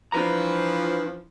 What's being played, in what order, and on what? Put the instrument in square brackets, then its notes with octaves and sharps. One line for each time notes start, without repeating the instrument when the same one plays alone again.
[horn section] E3 F3 [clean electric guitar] D4 B4 A#5